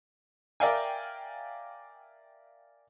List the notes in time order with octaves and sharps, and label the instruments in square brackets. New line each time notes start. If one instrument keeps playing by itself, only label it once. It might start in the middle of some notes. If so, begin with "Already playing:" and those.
[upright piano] A#4 D5 E5 F5 G5 G#5